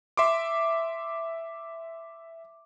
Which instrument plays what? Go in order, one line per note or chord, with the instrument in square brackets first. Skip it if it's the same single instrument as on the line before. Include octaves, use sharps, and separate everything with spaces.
[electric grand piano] E5 C6 D6